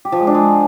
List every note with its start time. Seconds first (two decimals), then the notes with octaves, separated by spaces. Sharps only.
0.05 G4
0.12 F3
0.20 G#3
0.27 D4
0.35 G#3